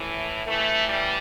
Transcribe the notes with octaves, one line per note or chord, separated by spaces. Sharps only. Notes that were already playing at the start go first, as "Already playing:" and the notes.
Already playing: A2 E3
A2 E3 A3
G3